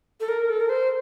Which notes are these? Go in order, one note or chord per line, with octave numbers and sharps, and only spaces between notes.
A4
A#4
A4
A#4
C5